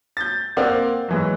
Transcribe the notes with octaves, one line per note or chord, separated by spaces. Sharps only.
G6 A6
A#3 C4 C5 D5 F5 F#5
G#2 E3 F#3